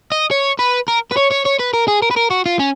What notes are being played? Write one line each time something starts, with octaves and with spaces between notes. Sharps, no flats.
D#5
C#5
B4
A#4
B4
C#5
C#5
C#5
B4
A#4
G#4
A#4
B4
A#4
F#4
F4
C#4